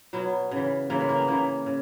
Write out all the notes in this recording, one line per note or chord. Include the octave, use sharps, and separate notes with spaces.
B2 F#3 B3
C#3 E3
C#3 E3 A#3
G#3
A#3
B3
C#3 E3 A#3
C#3